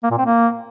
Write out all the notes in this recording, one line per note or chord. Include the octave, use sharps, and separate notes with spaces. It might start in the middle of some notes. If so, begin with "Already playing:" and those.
A#3
A#2
C4
A#3